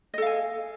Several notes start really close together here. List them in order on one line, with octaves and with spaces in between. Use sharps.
D#5 A4 F5 G#5